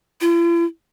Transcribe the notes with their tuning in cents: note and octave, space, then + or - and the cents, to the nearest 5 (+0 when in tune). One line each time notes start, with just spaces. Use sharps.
E4 +45